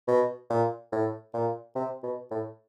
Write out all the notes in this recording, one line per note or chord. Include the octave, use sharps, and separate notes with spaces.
B2
A#2
A2
A#2
C3
B2
A2